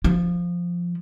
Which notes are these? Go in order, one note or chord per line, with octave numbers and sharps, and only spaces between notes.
F3